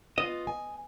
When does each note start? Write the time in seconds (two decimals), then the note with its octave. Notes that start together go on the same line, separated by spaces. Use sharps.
0.18 B3 F4 D#5
0.47 G#5